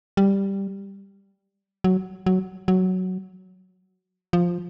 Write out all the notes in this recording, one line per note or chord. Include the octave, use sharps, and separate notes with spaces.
G3
F#3
F#3
F#3
F3